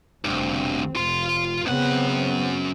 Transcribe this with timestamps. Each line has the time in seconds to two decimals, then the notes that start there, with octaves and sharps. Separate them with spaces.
0.25 F1 D2 G2 C4
0.96 F1 F4 C6
1.66 F#2 C#3 B3 C4 F#5